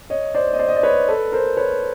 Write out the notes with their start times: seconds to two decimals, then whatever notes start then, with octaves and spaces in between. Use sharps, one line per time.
0.10 C#5 D#5
0.35 C5 D5
0.53 D#5
0.59 C5 D5
0.68 D#5
0.76 D5
0.83 B4 C#5
1.09 A4 B4
1.32 A#4 C5
1.57 B4 C#5